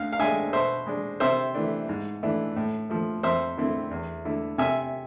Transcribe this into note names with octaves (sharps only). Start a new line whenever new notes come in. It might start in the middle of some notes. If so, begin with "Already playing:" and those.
Already playing: D2 F5
F5
D3 G#3 D4 E5 G#5
B2 C5 E5
G#3 D4
C3 C5 E5
E3 A3 D4
G#2
E3 A3 D4
A2
F3 A3
F2 C5 E5
D3 A3 C4 E4
E2
D3 A3 E4
C3 E5 G#5